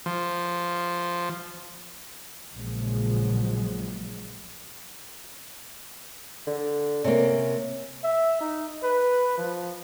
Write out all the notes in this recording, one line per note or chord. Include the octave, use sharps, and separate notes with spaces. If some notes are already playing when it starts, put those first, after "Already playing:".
F3
A#1 A#2 C#3 F3 F#3 G#3
D3
C3 A#3 C#4
E5
D#4
B4
F3